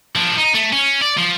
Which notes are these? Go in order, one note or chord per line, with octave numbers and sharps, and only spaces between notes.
F3 D4
D#4
A3
C#4
D5
F3